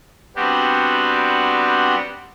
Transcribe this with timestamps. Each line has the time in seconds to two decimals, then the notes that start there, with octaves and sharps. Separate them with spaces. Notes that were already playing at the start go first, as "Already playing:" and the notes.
0.36 G3 B3 C4 D4 F#4 G4